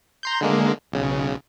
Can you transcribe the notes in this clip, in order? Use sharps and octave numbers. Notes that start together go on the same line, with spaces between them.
A#5 C6 G6
D3 G#3 A#3
B1 C#3